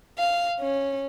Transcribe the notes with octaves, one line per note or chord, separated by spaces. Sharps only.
F5
C#4